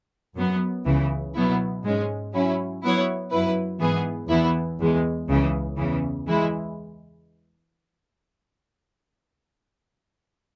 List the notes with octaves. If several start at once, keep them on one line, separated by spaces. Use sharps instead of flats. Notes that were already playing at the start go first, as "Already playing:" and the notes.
F#2 F#3 B3
C#2 C#3 E3
B2 F#3 B3 E4
G#2 G#3 C#4
F#3 C#4 E4
F#3 B3 E4 C#5
F#2 F#3 E4 B4
G#2 E3 B3 G#4
E2 E3 B3 E4
E2 E3 G#3
C#2 C#3 E3
E2 C#3 E3
E3 G#3 E4